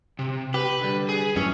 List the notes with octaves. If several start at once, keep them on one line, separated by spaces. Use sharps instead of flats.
C3
G4 B4
D3 G3
G#4
F#2 A2 E3 C#4